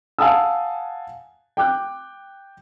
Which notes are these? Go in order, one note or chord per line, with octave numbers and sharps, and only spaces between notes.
F5 F#5 G#5 A5 D#6 E6
G5 D6 F#6